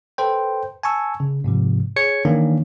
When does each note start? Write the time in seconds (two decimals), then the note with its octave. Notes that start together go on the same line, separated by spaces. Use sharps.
0.18 A4 B4 C5 G5
0.83 G#5 A5 C#6 E6
1.20 C#3
1.44 G#2 C3 F3
1.96 G#4 C#5 G#6 C#7
2.25 D#3 E3 A#3 C#4 D4